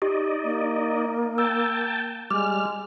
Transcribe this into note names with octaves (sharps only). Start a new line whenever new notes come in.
D#4 G4 D5 D#5
A#3
G5 A5 E6
G3 G#3 D6 F6